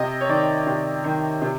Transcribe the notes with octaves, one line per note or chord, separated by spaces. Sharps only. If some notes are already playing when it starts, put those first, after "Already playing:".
Already playing: C3 D#5
C#5
D#3 D5
C3
D#3
C3